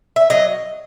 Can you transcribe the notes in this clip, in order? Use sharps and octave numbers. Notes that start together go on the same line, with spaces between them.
E5
F#3 D#5